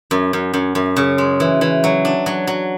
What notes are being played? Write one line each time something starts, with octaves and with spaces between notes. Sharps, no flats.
F#2
F#2
F#2
F#2
C#3
G#3
E3
E3
F#3
D4
F#3
F#3